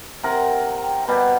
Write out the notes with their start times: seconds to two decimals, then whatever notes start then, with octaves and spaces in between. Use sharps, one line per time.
0.23 C3 A#4 F#5
0.80 G5
1.08 B2 G3 B4